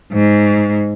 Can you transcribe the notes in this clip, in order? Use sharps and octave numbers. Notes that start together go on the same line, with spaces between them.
G#2